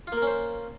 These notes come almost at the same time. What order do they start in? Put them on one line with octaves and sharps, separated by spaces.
F4 A#3 A#4 C#4 C5